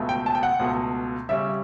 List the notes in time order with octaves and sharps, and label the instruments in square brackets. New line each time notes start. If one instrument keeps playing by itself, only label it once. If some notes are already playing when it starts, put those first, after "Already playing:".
Already playing: [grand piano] C#2 B2 A3
G5
A5
G5
F#5
C#2 B2 A3
C#3 G3 C#4 E5